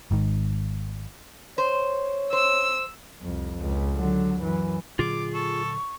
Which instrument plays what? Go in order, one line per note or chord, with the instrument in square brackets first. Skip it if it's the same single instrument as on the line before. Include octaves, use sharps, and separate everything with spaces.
[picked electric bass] G#1 G#2 D#3
[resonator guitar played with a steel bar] C5 [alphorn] C#5
[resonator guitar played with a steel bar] C5 [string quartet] E6
[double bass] C2 F2
C#2
D3 F#3
F#2 E3
[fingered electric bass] A#2 D3 F#3 [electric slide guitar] F4 G#4 [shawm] D6
[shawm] A4 [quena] C#6